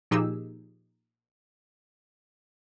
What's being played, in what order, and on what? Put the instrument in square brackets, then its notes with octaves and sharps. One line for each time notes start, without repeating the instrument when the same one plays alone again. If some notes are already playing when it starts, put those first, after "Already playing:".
[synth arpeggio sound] A#2 F3 D#4 G4 G#4 E6